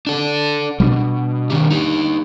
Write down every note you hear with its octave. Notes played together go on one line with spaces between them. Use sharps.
D4 A4
B2 G3 A3 D4
D#3 C#4 G4
D#4 G4